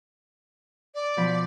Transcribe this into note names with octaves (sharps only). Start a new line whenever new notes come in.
D5
B2 F3 B5